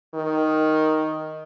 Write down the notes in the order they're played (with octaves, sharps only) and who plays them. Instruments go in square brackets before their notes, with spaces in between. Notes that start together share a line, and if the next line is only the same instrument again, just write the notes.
[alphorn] D#3